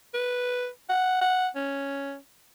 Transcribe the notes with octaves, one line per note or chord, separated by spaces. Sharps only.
B4
F#5
F#5
C#4